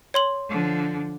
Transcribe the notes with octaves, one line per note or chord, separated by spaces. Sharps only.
C#5 C6 F#7
D3 F3